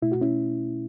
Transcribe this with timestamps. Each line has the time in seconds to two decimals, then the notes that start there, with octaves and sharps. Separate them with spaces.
0.02 B2 A3 E4
0.12 F#4
0.22 C#4 E4